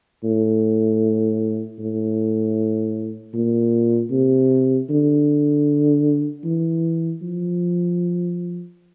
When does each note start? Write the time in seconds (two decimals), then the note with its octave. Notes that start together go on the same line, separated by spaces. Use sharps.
0.24 A2
1.79 A2
3.34 A#2
4.11 C3
4.90 D3
6.44 E3
7.22 F3